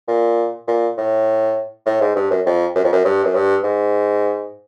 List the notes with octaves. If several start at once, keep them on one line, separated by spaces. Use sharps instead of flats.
A#2
A#2
A2
A2
G#2
G2
F#2
F2
F#2
F2
F#2
G2
F#2
G2
G#2